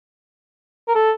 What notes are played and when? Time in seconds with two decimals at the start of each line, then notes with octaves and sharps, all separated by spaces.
0.88 A#4
0.95 A4